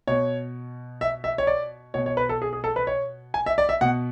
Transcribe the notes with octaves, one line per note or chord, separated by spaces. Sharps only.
B2 C#5
E5
E5
C#5
D5
B2 C#5
C#5
B4
A4
G#4
G#4
A4
B4
C#5
G#5
E5
D5
E5
B2 F#5